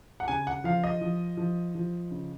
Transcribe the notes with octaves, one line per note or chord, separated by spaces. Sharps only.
F#5
C#3 G#5
F#5
F3 F5
D#5
F3
F3
F3
C#3